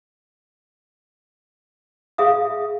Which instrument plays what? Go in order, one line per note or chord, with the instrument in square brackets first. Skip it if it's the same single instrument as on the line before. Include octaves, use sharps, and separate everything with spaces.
[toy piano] G#4 E5 F5 D#6